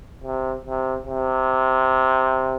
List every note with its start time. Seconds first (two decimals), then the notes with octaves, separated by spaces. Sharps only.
0.24 C3
0.66 C3
1.07 C3